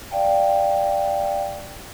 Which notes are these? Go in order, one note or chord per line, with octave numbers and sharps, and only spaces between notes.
D5 F5 G5 A5